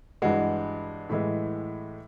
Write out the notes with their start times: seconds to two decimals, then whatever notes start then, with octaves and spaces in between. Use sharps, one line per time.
0.22 G2 E3 G#3 F#4
1.09 A2 E3 G#3